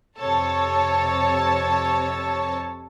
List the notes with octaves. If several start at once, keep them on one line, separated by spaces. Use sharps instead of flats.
F2 C3 A4 C#5 A5